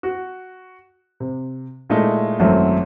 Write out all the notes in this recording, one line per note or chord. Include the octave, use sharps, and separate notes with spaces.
F#4
C3
A#2 G#3 A3 D#4 E4
G#1 F#2 F#3 A3 C4 E4